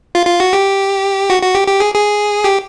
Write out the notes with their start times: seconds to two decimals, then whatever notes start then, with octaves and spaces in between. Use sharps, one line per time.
0.15 F4
0.27 F4
0.40 F#4
0.53 G4
1.30 F#4
1.42 F#4
1.55 G4
1.68 G4
1.80 G#4
1.94 G#4
2.44 G4